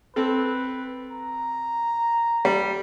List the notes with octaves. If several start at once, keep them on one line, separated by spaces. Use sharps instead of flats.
C4 A4 B4
A#5
G3